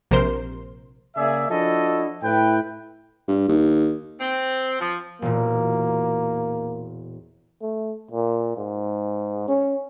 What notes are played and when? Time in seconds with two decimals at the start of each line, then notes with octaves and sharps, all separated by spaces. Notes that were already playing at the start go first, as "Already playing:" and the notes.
0.11 A#1 C3 A#4 C5 C6
1.16 C#3 A#3 G#4 D5 E5
1.50 F3 D4 E4 F#4 A4 D#5
2.23 A2 E4 B4 G5
3.28 G2
3.48 D#2
4.20 C4
4.80 F3
5.22 E1 A#2 A#3
7.62 A3
8.11 A#2
8.57 G#2
9.48 C#4